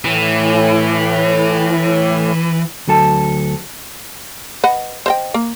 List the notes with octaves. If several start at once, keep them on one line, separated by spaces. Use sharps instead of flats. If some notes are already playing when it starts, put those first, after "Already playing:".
A2 E3
D2 F#3 A4 A5
B4 D#5 F#5
C5 D#5 G5
A#3